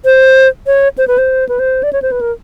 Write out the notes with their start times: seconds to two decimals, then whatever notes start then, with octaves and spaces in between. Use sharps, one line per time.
0.05 C5
0.67 C#5
0.98 C5
1.08 B4
1.18 C5
1.49 B4
1.59 C5
1.83 D5
1.93 C#5
2.02 C5
2.12 B4
2.21 A#4